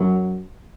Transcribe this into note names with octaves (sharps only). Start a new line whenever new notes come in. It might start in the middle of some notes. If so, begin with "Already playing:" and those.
Already playing: F#2 F#3